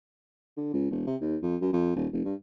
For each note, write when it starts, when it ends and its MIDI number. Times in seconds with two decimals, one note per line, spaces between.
0.57 0.70 50
0.74 0.88 37
0.91 1.04 28
1.07 1.16 48
1.21 1.37 39
1.42 1.56 41
1.61 1.69 42
1.73 1.92 41
1.96 2.07 27
2.13 2.24 29
2.25 2.35 43